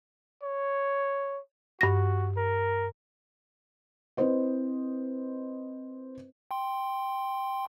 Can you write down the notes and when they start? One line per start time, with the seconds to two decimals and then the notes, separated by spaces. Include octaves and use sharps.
0.43 C#5
1.81 G2 F#4 A#6
2.37 A#4
4.17 C4 E4 B4 C5 D#5
6.51 G5 C6